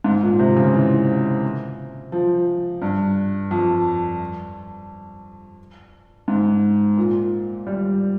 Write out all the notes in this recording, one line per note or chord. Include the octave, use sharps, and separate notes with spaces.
G#2
A#2
C3
C#3
E3
F3
G2
F2
G#2
A#2
G3